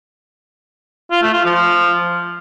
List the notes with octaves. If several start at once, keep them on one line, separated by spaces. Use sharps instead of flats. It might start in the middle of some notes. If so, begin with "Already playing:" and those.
F4
A3
F4
F3